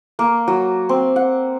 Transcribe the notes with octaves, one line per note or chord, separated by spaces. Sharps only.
A#3
F#3
C4
F#5